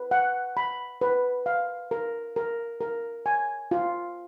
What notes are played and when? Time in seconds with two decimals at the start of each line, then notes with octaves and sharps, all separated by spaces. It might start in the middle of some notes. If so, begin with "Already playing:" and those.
Already playing: B4
0.11 F#5
0.57 B5
1.01 B4
1.46 F5
1.91 A#4
2.36 A#4
2.81 A#4
3.26 G#5
3.71 F4